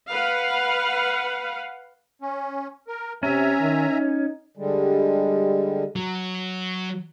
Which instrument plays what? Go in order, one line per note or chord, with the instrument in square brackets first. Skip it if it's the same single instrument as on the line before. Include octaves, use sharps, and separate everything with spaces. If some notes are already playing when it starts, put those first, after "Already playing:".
[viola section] B4 F5 F#5
[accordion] C#4
A#4
[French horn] C3 [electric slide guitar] C#4 [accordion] E5 G#5 A#5
[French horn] D#3
D#4
[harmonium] D3 G3 G#3
[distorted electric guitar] F#3